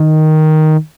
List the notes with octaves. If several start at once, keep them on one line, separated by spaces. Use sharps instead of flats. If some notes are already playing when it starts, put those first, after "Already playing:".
Already playing: D#3